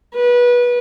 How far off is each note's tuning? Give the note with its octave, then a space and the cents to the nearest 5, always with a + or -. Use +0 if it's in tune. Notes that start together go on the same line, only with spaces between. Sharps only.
B4 -25